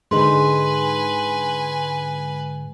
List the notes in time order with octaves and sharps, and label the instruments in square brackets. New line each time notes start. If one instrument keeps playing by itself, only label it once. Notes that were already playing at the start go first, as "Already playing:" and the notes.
[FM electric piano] G#2 D3 G#3 [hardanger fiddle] B4 G#5 [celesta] C6